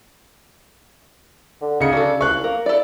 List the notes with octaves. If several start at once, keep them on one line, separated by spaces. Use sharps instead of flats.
D3
C#3 D#4 C#7
D4 F#4 A4
C2 F5 C#6 F#6
A#3 A#4
E4 A4 D5